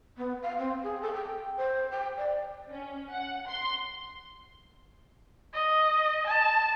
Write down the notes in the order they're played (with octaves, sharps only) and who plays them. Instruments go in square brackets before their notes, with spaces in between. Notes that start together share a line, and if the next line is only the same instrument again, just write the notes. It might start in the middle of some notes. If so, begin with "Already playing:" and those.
[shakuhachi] B3
F5
C4
G#4
A4
G5
C5
G5
D5
[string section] C#4
F#5
C6
[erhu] D#5
A5